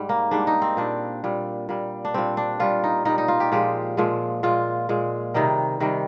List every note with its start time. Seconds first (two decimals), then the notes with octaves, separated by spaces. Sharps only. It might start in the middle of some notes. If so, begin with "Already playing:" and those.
Already playing: G#2 G3
0.09 A#3
0.31 G#2 G3 D4
0.47 D#4
0.62 C4
0.77 A#2 G3 D4
1.24 A#2 G3
1.69 A#2 G3
2.05 D4
2.14 A#2 G3 C4
2.37 D4
2.60 A#2 G3 F4
2.84 D#4
3.05 A#2 G3 D#4
3.18 D#4
3.28 F4
3.40 G4
3.52 A#2 F3 G#3 G4
3.97 A#2 F3 G#3
4.43 A#2 G#3 F4
4.89 A#2 G#3
5.34 C3 D#3 G3 D#4
5.80 C3 D#3 G3